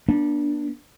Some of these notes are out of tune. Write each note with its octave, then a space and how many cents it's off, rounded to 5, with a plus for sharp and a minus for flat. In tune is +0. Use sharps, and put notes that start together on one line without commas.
B3 -40 D4 +0